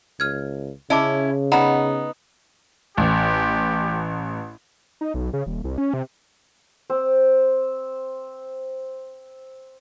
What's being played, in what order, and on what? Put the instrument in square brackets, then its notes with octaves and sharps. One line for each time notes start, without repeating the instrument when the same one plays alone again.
[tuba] C#2 [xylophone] F6 G#6
[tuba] C#3 [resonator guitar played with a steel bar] C#4 E4 [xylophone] D#5 A5 D6
[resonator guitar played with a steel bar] B3 D#4 [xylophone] F#5 A#5 B5
[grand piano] A1 [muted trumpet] G4
[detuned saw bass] D#4
B1
C#3
D#1
C2
C#4
C3
[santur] C4 C5